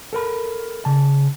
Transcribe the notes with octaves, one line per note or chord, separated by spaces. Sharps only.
A4 A#4 B5
C#3 A5